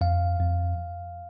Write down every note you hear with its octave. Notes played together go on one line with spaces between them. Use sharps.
F2 F5
F2